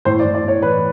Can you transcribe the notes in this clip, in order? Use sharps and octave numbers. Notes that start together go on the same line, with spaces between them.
A2 C5
D5
A2
D5
A2 C#5
E3 B4